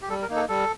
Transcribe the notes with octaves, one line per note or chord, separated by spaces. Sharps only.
G4
G3 A4
A#4
A#3 D#4
A4
G3 A4